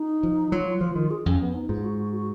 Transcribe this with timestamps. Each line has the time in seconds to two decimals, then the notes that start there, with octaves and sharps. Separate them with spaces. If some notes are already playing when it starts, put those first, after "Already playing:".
Already playing: D#4
0.23 F3
0.52 F#3 F4
0.81 F3
0.96 D#3
1.10 G#4
1.25 F2 C#4
1.40 B3
1.55 D#4
1.69 G#2 F4
1.84 F#4
1.98 F#4
2.12 F#4